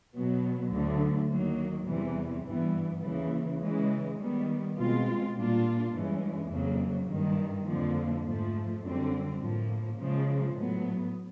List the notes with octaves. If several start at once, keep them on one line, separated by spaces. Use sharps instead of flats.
B2 F#3 B3
D2 D3 F#3 A3
D#3 F#3 A#3
E2 C3 E3 G3
G2 E3 G3 B3
D#2 C#3 E3
C#3 E3 G#3
D#3 G3 B3
B2 G#3 C4 F4
A#2 G3 A#3 D4 F4
G2 E3 G#3 C#4
F2 C#3 F#3 A#3
G2 D#3 G3
F2 D3 F3 A#3
G#2 F3 A3
F#2 D3 G3 C4
A2 F3 A#3
C#3 F3 G#3
A2 F#3 B3